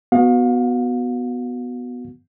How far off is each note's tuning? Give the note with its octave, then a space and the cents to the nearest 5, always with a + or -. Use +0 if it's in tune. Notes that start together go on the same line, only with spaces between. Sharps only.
B3 +0 F#4 +0 F5 +35